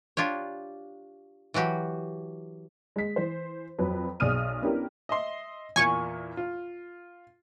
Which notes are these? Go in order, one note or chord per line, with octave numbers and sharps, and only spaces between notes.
D4 F4 G4 C#5
E3 F#3 F#4 G4
G#3 B6
E3 C5
F2 F#3 B4
B1 G#4 D5 D#6 F6 D#7
B3 C#4 D4 E4 G4 A#4
D#5 E5 C6
E2 A#2 G#5 C#6
F4